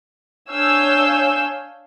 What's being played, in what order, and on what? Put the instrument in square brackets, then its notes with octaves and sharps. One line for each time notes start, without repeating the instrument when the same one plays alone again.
[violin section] D4 C#5 F5 G#5 E6 G6